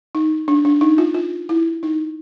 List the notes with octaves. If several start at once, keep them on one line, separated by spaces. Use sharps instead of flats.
D#4
D4
D4
D#4
F4
F4
E4
D#4